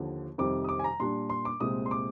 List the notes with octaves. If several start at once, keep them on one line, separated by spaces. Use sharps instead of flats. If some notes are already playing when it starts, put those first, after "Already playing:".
Already playing: D#2 D3 F3
F2 C3 D#3 G3 D6
D#6
D6
G#5
A#5
A#2 G3 D4 C6
C6
D6
C2 A#2 G#3 C4 D#6
C6
D6